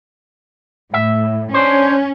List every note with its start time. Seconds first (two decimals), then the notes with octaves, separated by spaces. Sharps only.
0.94 A2 E5
1.54 C#4 D4 C5